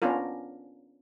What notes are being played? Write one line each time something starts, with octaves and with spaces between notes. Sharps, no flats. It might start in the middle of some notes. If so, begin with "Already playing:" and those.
B3 C#4 D4 F4 A#4